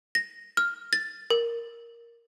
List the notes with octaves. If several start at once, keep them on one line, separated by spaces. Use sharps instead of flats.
A#6
F6
A6
A#4